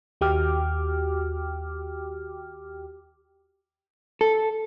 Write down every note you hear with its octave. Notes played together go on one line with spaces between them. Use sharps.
D#2 F#4 G4 G5 D6 F6
A4